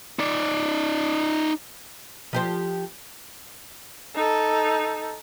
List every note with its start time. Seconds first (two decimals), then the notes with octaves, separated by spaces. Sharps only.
0.19 D#4 D5
2.33 F3 G4 C5
4.15 D#4 A4